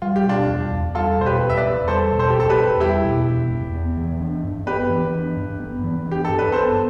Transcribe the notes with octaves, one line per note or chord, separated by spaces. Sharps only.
G3 F4
G4
B2 D4 F4
E2
E2
G3 F4 A4
B2 C5
G4 B4
E2
E5
B4 D5
E2
G3 A4 C5
B2
A4 C5
G4
E2 A4
G4 B4
E2
G3 E4 G4
B2
E2
E2
B3
E3
D4
G2
B3 G4 B4
E3
D4
G2
B3
E3
D4
G4
G2 A4
B4
B3 A4 C5